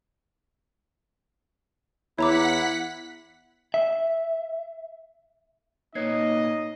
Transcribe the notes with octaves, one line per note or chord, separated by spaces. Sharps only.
E2 E4 C#5 F#5 A#5 D6 B6
E5
A#2 A#3 B3 D#4 C#5 D#5 G#6 C7